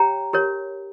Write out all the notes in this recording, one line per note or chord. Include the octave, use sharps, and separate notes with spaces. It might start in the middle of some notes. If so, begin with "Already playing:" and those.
Already playing: G4 C#5 G5 A#5
G4 A#4 C#5